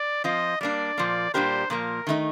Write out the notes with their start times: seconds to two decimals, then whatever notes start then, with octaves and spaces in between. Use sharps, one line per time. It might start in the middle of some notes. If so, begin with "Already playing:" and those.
Already playing: D5
0.24 F3 C4 F4 C5 D#5
0.61 G3 A#3 D4 D5
0.98 A#2 F3 A#3
1.34 A#2 G3 D4 G4 A#4 C5
1.70 A#2 F3 A#3 A#4
2.07 D#3 A3 D#4